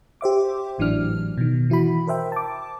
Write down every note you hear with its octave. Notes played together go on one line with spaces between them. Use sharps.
G4 C5 E5 D6
G#1 A2 E3 F#3 D4 F6
B2 D#3
E3 E4 F#4 B5
A#4 C5 E5 G5
A5 D6